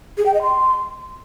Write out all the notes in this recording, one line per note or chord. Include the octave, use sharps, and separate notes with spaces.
G#4
G5
D#5
C6